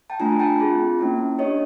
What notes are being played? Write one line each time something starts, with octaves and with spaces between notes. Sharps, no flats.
G5 A5
A3 D4 F4 G#5 A#5
G5 A5
C4 F4 G#4
A#3 C#4 E4
D4 G4 C#5 D#5